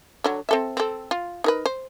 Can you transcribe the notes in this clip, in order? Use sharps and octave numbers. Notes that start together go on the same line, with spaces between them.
D3 F#3
C4 A4 E5
C4 A4
F4
D#4 A#4 B4
C5